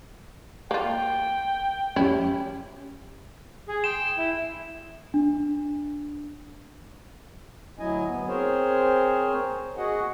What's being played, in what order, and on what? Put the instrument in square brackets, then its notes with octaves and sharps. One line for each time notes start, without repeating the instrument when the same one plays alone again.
[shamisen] A#3 F4 [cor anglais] G5
[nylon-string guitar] C#4 G4 [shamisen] E4
[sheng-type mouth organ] G#4
[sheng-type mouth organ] G5 C6 [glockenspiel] E7
[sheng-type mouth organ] E4
[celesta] D4
[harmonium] D2 F#3 E4 D#5 G#5
B3
C4 G#4 A#4 C5 C#5
F#4 G#4 D#5 F#5